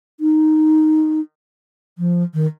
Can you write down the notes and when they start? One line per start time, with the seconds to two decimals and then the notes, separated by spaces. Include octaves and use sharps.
0.20 D#4
1.98 F3
2.34 D#3